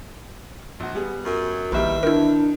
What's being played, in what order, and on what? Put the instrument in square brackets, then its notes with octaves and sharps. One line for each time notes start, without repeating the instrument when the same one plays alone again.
[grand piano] A#1 F#4
G3 B3 G#4
[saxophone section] F#2
[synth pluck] A#1 [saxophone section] E2 B4 E5 [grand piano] D#3 G3 A#3
[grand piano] D#3 [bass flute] D4 [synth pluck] E4 A#4